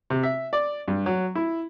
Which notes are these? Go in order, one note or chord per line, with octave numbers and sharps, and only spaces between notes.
C3
E5
D5
G2
F#3
E4